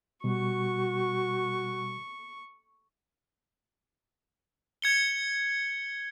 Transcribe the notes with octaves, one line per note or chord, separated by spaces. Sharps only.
B2 G3 F#4 C#6
G#6 C#7 G7